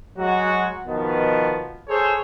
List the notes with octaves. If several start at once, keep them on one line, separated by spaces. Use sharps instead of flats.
F#3 G#3 F#4
B2 D#3 F3 B3
G#4 A4 C5 C#5